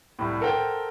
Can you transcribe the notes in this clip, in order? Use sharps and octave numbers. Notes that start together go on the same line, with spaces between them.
C2 A2
A4 A#4 C5 F#5 G5